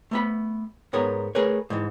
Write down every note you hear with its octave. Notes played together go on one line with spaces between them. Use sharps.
A3 B3 B5
G#2 B3 A#4 C#5
A3 G#4 A#4 B4 C#5
G#2 E3